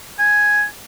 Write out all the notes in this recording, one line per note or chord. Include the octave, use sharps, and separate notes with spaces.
G#5